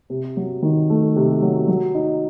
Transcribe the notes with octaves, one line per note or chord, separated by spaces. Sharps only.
C3
F#3
D#3
A3
C3
F#3
F#3
D#4